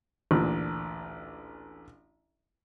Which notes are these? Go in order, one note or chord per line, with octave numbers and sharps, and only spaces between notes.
A1 D2 A#2